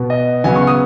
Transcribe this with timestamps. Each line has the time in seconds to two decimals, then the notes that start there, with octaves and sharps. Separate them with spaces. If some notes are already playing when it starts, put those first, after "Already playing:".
Already playing: B2 B3
0.10 D#5
0.44 C#3 F#3 B3 G#5
0.56 C#6
0.67 D#6